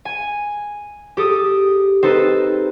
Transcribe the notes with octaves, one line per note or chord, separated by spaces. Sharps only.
G#5
G4 A4 D#6
C4 D#4 A4 B4